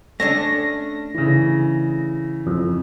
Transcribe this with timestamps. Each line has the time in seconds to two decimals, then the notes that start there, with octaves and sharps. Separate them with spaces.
0.20 A3 C#4 D4 A#6
1.14 C#3 E3
2.47 F2